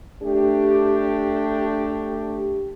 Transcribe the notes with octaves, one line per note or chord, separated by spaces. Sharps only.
A3 D4 G4